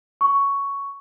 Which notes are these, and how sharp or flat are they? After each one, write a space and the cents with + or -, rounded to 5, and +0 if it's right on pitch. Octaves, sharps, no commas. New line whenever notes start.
C#6 +5